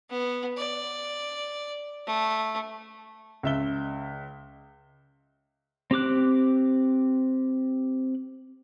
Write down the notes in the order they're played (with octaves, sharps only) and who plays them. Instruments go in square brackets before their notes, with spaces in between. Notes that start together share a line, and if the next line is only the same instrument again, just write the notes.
[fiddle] B3
D5
A3
[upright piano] C#2 E5 G7
[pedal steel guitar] C4 G4 D6 F#6